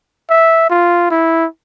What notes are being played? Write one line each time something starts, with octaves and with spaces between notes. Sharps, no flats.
E5
F4
E4